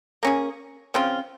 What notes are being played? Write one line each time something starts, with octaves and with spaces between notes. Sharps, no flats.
A#3 C#4 G#4
C#3 F3 C4 F4